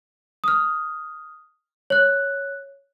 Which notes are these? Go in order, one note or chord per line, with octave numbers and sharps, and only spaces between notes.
D#6 F6
C#5 F#6